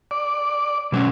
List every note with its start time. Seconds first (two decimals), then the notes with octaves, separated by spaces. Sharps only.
0.11 D5
0.92 B2 F#3 C#4